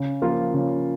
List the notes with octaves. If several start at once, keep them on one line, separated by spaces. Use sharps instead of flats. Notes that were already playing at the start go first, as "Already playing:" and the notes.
Already playing: C#3
F3 A#3 F4
C#3